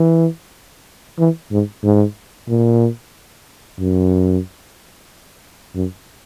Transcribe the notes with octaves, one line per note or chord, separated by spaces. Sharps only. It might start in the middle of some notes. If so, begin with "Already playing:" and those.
Already playing: E3
E3
G#2
G#2
A#2
F#2
F#2